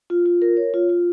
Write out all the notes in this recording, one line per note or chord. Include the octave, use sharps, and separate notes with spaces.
F4
F4
A#4
C#5
F4
F4